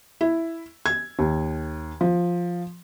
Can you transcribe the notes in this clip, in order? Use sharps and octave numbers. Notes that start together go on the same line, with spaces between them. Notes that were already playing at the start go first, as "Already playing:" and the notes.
E4
G#6
D#2
F3